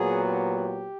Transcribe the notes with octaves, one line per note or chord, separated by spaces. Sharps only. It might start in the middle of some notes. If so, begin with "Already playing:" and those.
Already playing: A#2 F#3 B3 G#4
G4